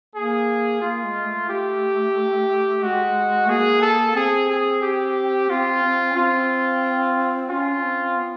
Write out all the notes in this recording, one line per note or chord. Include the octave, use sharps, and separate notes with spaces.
A#3 G#4
A#3 F4
G#3
A3
G4
G#3 F#4
A#3 G#4
A4
C4 G#4
G#4
G4
C4 F4
C4
C#4
C4 F4
C#4 F4
C4
B3